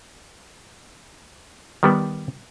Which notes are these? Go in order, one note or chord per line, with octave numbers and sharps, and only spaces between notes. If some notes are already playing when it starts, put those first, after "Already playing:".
D#3 G3 B3